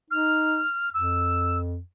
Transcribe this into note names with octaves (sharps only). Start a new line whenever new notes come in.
D#4 F6
F2 E6